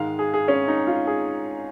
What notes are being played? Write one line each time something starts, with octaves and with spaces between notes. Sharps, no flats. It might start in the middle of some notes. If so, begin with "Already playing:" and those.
Already playing: G#2 D#3 G#3 F5
G#4
G#4
C#4
D#4
F4
G#4